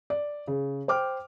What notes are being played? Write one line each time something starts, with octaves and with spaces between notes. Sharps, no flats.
D5
C#3
C5 G5 D6 F6